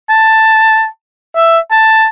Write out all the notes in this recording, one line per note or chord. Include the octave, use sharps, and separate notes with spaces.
A5
E5
A5